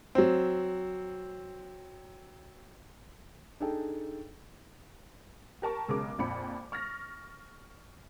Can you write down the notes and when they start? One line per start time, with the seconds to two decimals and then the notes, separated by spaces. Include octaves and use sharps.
0.15 F#3 C4
3.60 D4 D#4 G#4 A4 G5
5.62 G4 A#4 A5 C#6
5.88 B1 C#3 G#3 A#4 D6
6.18 A#1 F2 B5 C#7
6.72 C#6 F6 A6 A#6